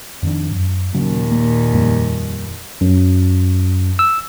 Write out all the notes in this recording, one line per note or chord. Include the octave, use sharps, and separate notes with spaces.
F2 D#3 D4
F#2
D#2 A#2 C#3 F#3
A#3
F2 G3 A#3
F#2
E6